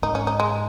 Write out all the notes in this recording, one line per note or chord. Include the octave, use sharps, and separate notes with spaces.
G#2 D#4
C#4
D#4
G#3